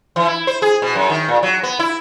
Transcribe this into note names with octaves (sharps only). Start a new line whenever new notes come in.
E3
E4
C5
G#4
B2
F#2
D#3
A#2
F#3
B3
E4